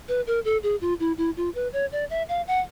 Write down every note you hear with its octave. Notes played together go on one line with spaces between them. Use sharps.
B4
A#4
A4
G#4
F4
E4
E4
F4
B4
C#5
D5
E5
F5
F#5